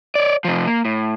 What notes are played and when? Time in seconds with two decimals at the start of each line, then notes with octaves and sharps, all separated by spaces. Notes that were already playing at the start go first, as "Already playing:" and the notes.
0.15 C#5 D5
0.45 C3 F3
0.66 A#3
0.85 A2